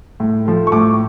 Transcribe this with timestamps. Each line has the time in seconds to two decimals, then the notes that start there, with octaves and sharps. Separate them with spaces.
0.20 A2
0.46 F3 A3
0.67 C#6
0.72 A2 D6